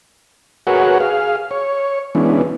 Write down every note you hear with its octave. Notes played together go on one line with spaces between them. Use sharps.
F#4 G#4 A#4 B4 C#5 F#5
G#4 F5
C#5
E3 G#3 B3 C#4 D4